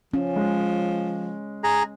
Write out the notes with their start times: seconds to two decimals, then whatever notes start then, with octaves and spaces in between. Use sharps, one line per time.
0.14 F3 C#4
0.36 G#3
1.64 G#4 A#5